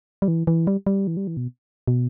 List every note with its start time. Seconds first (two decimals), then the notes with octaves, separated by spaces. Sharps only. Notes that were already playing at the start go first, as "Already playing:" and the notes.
0.22 G3
0.28 E3
0.47 E3
0.67 G3
0.87 G3
1.07 E3
1.17 G3
1.27 E3
1.37 B2
1.88 B2